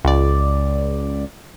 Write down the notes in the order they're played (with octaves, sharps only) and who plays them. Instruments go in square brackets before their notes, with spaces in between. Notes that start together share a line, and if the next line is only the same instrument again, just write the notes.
[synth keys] C#2 D5